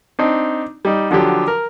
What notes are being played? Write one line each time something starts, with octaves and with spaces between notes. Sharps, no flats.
C4 D4 D#4
G3 D#4
D3 F3 F#3 G4
A#4